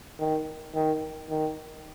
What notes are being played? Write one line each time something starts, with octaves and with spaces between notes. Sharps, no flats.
D#3
D#3
D#3